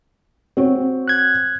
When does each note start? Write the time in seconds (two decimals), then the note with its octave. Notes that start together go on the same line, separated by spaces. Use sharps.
0.57 C4 F#4 C#5
1.08 F#6 G#6